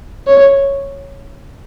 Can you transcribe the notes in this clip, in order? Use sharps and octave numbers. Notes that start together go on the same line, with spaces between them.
C#5